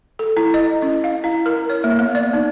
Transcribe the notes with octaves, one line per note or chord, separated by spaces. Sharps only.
A4
E4
D#5
C#4
F5
E4
A#4
C#5
A#3
B3
D5
D#4